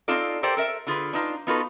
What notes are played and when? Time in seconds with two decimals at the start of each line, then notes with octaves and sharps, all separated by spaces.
0.08 C4 D#4 F4 A4 D5
0.43 G4 A4 A#4 C5 D5 G5
0.57 A4 A#4 E5
0.87 D3 F4 G#4 B4
1.13 D4 D#4 F4
1.47 B3 D#4 F4 F#4 A4 B4